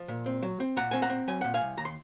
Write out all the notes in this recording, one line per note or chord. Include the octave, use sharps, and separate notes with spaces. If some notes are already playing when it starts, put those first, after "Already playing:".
Already playing: F3
A#2
C4
F#3
C4
A#2 F#5 A#5
C4 G#5
F#5 A#5
C4
F#3 G#5
A#2 F#5
F5 G#5
C2
D#2 A#5
C6